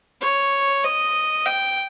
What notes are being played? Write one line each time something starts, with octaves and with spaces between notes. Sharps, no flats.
C#5
D#5
G5